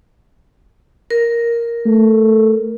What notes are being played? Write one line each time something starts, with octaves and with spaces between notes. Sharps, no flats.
A#4
A3